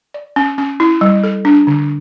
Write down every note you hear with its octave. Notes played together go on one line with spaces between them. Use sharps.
D5
C#4
C#4
E4
G3
A4
D4
D3